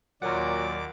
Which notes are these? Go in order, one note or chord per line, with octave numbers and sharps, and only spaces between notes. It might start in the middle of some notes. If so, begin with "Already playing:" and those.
D#2 A#2 F#3 A#4 D5 F#5 D6